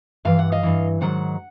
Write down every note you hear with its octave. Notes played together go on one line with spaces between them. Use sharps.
G2 E3 F5
F#5
D#5 F5
G2 E3
G#2 D#3 F#3 F#5